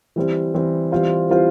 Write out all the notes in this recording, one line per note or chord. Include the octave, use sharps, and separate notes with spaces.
E3 G3 C4
E3 G3 C4
E3 G3 C4 F4 C5
E3 G3 C4 F4 C5